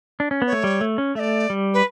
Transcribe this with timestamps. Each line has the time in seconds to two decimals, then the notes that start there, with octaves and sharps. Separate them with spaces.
0.20 D4
0.31 C#4
0.42 B3
0.47 C#5
0.53 A3
0.64 G3
0.81 A3
0.98 C#4
1.15 A3 E5
1.19 D5
1.50 G3
1.74 B4